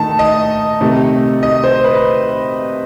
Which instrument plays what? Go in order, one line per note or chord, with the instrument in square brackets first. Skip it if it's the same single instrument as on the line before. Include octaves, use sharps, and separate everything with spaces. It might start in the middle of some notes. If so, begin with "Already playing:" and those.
Already playing: [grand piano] D#3 A3 D#4 A5
D#5
C3 D#3 A3 D#4
D#5
C5
B4